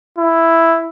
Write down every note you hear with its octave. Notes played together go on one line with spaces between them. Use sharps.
E4